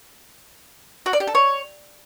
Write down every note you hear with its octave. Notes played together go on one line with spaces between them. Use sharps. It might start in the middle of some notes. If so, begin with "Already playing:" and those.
F#4
D5
G4
A4
C#5